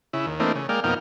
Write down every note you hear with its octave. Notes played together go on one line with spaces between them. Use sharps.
C#3 E4
D#2
E3 A3 A#3 C4 D4 D#4
C#3
G#3 A#3 D5 F5 G5
F2 B2 A#3 D#4 F5 G5